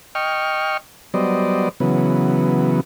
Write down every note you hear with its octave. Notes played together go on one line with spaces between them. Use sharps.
D#5 G5 C#6 F6
F#3 G3 B3 C5 D5 D#5
C#3 E3 F#3 B3